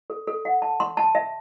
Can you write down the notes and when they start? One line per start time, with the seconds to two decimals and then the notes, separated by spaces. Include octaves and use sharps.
0.10 A4
0.27 A4
0.45 F#5
0.62 A5
0.80 C6
0.97 A5
1.15 E5